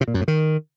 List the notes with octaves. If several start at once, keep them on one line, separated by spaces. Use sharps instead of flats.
C3
A#2
F#2
A2
D#3